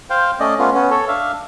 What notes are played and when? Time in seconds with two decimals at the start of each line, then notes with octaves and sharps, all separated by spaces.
0.10 C5 F5 G5
0.40 A3 C#4 D5 D#5
0.59 A3 B3 C#4 F4
0.74 B3 C#4
0.90 A4 C#5
1.08 D4 E5 F5